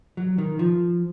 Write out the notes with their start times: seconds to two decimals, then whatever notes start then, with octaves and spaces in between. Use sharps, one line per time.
0.17 F#3
0.38 D#3
0.59 F3